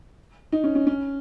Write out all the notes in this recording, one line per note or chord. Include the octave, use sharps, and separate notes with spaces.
D#4
C#4
C#4
C#4